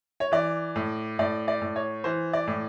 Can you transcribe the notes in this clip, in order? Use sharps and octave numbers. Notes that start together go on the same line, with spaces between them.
C#5
E3 D5
A2
A2 D5
D5
A2
C#5
E3 C5
D5
A2